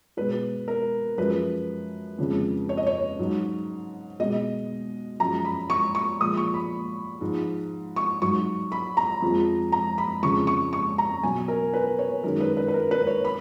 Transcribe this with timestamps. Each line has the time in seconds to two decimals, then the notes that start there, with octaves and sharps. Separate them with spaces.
0.17 B2 G#3 B4
0.68 A#4
1.17 F#2 F3 G#3 B4
2.18 F2 C#3 G#3
2.69 C#5
2.77 D#5
2.87 C#5
3.19 G#2 F#3
4.20 B2 G#3 D#5
5.20 F#2 F3 G#3 A#5
5.45 B5
5.70 C#6
5.95 C#6
6.21 A#2 F3 G#3 D#6
6.37 C#6
6.54 B5
7.21 G#2 F3 G#3
7.96 C#6
8.22 G#2 F#3 C#6
8.72 B5
8.97 A#5
9.22 F2 F3 G#3
9.72 A#5
9.98 B5
10.22 F2 C#3 G#3 C#6
10.47 C#6
10.73 C#6
10.98 A#5
11.23 B2 F#3 G#5
11.48 A#4
11.74 B4
11.99 C#5
12.24 F#2 D#3 G#3 A#4
12.41 B4
12.57 B4
12.68 B4
12.74 A#4
12.91 B4
13.07 C#5
13.25 B5